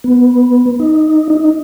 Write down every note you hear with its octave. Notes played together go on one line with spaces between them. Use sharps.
B3
D#4
D#4